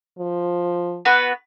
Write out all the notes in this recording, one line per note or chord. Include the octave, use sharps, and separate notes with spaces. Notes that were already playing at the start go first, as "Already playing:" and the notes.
F3
B3 F#4 B4